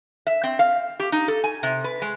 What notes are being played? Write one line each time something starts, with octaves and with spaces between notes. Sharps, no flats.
E5
C4
F5
G4
D#4
A4
G#5
C3
B4
G#3